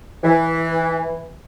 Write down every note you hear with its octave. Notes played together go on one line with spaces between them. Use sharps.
E3